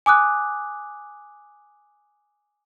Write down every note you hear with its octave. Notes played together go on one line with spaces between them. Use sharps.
G#5 D6 D#6 F#6